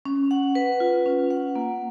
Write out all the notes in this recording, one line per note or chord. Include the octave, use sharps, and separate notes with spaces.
C#4
F#5
B4
F4
C#4
F#5
A#3